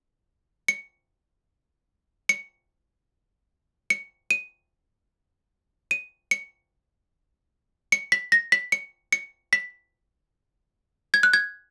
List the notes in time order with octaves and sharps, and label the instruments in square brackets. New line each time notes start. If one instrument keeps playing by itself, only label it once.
[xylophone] C#7
C#7
C#7
D#7
D#7
C#7
C#7
B6
A#6
B6
C#7
C#7
B6
G#6
F#6
G#6